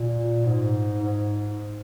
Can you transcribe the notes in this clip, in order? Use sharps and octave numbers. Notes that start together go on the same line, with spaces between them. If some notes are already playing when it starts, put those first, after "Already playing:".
Already playing: A#2
G#2
G#2